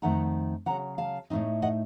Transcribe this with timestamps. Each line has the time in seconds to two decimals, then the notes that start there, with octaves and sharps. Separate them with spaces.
0.02 F2 D#3 A3 F#5 A#5
0.66 F2 C#3 F#3 F#5 A#5
0.98 F5 A5
1.30 A2 A3 C4 D#4
1.62 D#5 F#5